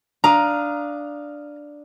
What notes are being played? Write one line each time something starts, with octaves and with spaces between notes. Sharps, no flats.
D4 F5 A#5 D#6